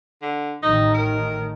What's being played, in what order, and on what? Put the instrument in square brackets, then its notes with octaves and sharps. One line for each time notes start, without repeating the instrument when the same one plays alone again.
[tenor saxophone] D3
[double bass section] A1 A2 D#3 [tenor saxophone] D#4
[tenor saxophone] A#4